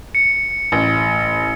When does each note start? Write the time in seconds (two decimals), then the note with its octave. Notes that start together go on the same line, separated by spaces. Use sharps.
0.15 C#7
0.72 A1